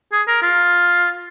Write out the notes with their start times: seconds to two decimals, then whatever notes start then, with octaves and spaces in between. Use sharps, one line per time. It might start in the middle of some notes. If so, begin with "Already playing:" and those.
0.12 G#4
0.28 A#4
0.42 F4